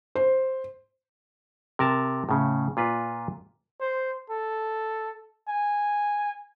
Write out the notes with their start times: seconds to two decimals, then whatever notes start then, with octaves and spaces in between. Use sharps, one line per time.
0.15 C5
1.79 C3 A#4 A5
2.29 A2 C#3
2.77 A#2 F4 B4
3.81 C5
4.30 A4
5.48 G#5